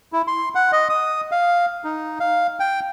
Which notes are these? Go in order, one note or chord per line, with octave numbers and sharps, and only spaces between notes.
E4
C6
F#5
D#5
D#6
F5
D#4
F5
G5